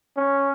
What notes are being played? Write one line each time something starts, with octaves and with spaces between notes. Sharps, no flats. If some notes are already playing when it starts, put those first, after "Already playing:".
C#4